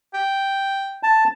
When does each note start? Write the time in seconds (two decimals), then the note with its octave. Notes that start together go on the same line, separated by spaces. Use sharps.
0.14 G5
1.03 A5